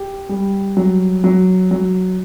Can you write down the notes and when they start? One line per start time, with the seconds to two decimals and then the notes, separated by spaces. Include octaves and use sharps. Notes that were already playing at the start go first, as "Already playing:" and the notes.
Already playing: G4
0.29 G3
0.77 F#3
1.24 F#3
1.71 F#3